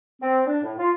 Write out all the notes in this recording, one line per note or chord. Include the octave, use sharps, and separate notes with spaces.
C4
D4
A2
F4